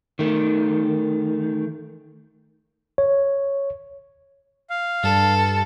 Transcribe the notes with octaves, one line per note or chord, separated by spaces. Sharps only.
D#3 A3
C#5
F5
G2 A4